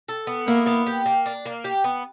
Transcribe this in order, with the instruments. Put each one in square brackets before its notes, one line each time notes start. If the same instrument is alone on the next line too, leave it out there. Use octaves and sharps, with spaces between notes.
[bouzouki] A4
B3
[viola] A#3 [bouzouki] E4
[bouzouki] B3
G4
A#3
D4
A#3
G4
B3